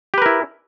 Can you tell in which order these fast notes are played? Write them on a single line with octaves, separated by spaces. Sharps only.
G4 B4 A#4 E4